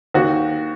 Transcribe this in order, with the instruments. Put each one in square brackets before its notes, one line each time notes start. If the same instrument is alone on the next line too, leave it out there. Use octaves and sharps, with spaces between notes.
[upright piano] D#2 F#4